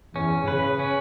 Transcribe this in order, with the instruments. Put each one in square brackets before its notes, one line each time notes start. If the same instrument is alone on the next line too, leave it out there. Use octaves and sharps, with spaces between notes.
[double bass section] E2 [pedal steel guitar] C#4
[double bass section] C#3 [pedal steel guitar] B4
[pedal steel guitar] C#4